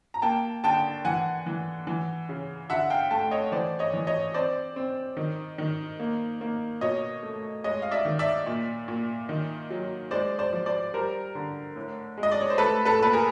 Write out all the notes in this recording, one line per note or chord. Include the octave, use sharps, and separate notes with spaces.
A#5
A#3 G5 A5
D3 G5 A5
E3 F#5 G#5
E3
E3
C#3
D3 E5 F#5
F5 G5
A3 G5 A5
C#5 D#5
E3 C5 D5
C#5 D#5
E3
C#5 D#5
C4 C5 D5
C4
D#3
D#3
A#3
A#3
B2 C#5 D#5
A3
G#3 C#5 D#5
F5
D5 E5
D#3
D5 E5
A#2
A#2
D#3
F#3
G#3 C5 D5
C5 D5
F3
C5 D5
G3 A#4 C5
D3
A2
G#3
D#5
D5
C#5
C5
A3 A4 B4
A4 B4
A#2 B4
G#4 A#4